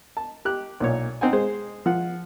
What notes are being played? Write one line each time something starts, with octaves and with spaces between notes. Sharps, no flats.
A5
G4 F#6
B1 A#2 C#5
C4 D#4 F#5 G#5
G#3 C5
F3 F#5